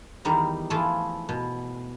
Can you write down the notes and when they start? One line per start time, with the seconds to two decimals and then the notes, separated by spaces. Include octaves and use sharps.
0.25 E2 D#3 G3 A#5
0.70 E3 F3 A3 F4 G#4 A4
1.29 B2